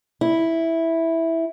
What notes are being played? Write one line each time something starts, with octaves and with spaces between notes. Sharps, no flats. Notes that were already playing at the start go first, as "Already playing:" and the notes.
E4